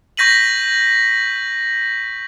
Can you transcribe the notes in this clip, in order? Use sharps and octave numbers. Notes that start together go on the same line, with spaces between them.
C#6 G6 A#6 B6 D#7 F#7